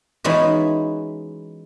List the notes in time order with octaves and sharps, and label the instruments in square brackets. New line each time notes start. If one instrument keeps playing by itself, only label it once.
[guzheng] E3 G#3 B3 C#4 D#4 F#4